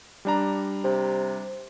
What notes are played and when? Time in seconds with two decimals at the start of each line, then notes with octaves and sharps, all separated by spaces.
0.25 G3 D4 A#5
0.84 C3